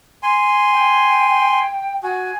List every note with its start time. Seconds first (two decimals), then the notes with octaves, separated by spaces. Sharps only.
0.23 G#5 C6
0.73 G5
2.03 F#4 G#5